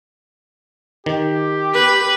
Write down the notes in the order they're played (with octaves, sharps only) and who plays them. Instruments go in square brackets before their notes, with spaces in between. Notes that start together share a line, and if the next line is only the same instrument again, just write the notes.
[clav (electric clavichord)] D#3 [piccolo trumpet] G4
[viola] B4